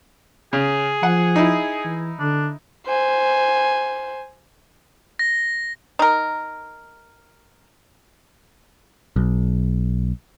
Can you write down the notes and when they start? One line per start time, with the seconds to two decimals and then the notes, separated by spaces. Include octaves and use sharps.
0.53 C#3 G#4
1.03 F3 F#5
1.36 D#4 E4
1.84 E3
2.19 D3 D4
2.87 C5 G#5
5.19 A#6
5.99 D#4 A#4
9.16 B1